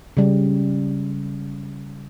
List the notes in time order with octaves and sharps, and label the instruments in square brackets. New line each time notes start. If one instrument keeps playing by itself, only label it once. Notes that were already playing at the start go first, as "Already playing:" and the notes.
[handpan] C#3 G3